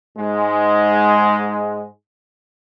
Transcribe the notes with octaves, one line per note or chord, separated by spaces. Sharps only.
G#2 G#3